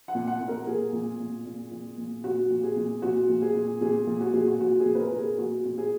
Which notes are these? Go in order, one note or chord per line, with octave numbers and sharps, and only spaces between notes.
F#5
A#2
F#5
A#2
A#4
A#2 G#4
A#2
A#2
A#2
A#2
A#2
A#2 F#4
A#2
G#4
A#2
A#2 F#4
A#2
G#4
A#2
A#2 G#4
A#2
F#4
A#2 G#4
F#4
A#2 F#4
G#4
A#2
B4
A#4
A#2
G#4
A#2 F#4
A#2
G#4